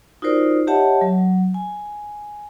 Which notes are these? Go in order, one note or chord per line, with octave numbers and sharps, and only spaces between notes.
D#4 F4 F#4 A#4 C5 D5
G4 C#5 D#5 E5 F#5 A5
F#3
G#5